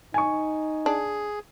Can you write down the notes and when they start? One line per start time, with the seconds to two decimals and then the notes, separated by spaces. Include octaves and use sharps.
0.14 D#4 G#5 C#6
0.86 D4 G#4